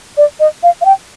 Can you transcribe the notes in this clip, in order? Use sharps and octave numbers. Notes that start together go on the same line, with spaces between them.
D5
D#5
F5
F5
G5